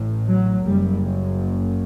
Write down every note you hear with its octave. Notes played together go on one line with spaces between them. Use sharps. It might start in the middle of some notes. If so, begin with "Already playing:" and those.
Already playing: A1 A2
F#3
F#1 F#2 G3